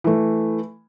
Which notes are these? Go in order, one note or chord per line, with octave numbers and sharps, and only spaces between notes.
E3 A3